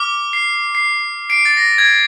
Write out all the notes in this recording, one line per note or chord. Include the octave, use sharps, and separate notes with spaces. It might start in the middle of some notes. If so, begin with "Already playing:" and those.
Already playing: D6 F6
C7
C7
C7 D7
A6
A#6
G#6